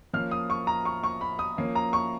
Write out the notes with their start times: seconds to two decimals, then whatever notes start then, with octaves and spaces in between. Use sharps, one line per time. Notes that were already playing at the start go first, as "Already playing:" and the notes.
0.13 F3 A#3 C#4 F6
0.31 D#6
0.50 C#6
0.67 A#5
0.85 C#6
1.04 C#6
1.21 B5
1.39 D#6
1.57 F3 A#3 C#4
1.75 A#5
1.93 C#6